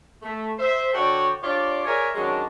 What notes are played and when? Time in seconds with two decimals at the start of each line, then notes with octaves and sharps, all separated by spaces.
0.22 A3
0.58 C5 E5
0.93 D3 F#4 A4 C#5 D5 G5
1.42 D4 F4 G4 C#5 D5
1.85 G#4 A#4 C#5 D5 E5 G#5
2.15 D#3 F#3 G#3 C#4 D4